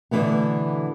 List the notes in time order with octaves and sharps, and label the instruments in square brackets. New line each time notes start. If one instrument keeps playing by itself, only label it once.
[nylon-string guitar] B2 D3 E3 A3 B3